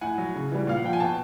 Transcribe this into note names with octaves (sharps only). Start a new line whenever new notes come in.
A2 F#5 G#5
F#3
C#3
E3 G3
A#2 F5
F#5
F3 G5
G#5
B2 G5 A5